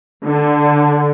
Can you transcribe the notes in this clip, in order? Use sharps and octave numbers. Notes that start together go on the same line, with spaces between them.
D3